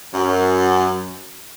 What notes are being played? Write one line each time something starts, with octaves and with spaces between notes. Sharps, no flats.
F#2